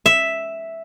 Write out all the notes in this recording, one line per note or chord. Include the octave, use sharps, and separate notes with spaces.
E5